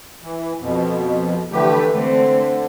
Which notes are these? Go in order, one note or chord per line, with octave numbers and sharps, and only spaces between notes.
E3
F2 B2
D3 E3 A3 G4 A4 B4
D3 A3 C4